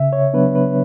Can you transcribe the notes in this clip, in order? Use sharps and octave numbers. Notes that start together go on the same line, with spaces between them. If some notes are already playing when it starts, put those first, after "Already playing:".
Already playing: C#3 E5
C#5
F#3 B3 D4 B4
B4